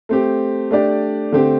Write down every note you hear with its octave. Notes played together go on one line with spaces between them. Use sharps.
A3 C4 G4
A3 D4 G4 D5
D3 A3 C4 G4